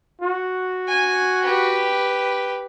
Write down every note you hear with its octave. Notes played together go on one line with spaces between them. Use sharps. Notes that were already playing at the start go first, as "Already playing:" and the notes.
F#4
G#5
G4 B4